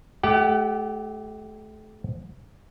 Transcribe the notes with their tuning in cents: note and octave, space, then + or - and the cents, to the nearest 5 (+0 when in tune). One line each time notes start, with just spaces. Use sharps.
A3 -35 G4 -5 F#5 +35